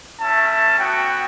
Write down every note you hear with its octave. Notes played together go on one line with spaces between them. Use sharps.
A3 C#4 E4 A5
A5
B3 F#4 G5